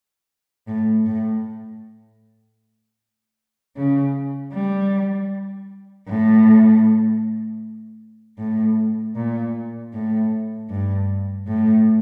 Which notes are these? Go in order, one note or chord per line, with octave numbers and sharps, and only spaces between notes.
A2
A2
C#3
G3
A2
A2
A#2
A2
G2
A2